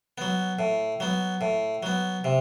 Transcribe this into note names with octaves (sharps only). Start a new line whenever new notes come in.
F#3 B3
A2
F#3 B3
A2
F#3 B3
C3